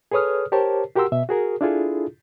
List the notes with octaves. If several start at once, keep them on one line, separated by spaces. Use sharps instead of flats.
G#4 A4 B4 C#5 D#6 F6
G4 A#4 C5 C#5 A5
F#4 G4 A#4 F#5 C6 E6
B2 E5
F#4 G#4 A#4
D4 E4 F4 G#4 A4